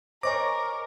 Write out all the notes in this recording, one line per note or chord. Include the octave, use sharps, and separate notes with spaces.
A#4 C5 C#5 D#5 G#5 C#6 D6 A#6